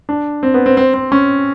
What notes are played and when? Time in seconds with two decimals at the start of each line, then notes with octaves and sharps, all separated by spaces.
0.09 D4
0.43 C4
0.54 B3
0.66 C4
0.77 C4
0.94 C4
1.12 C#4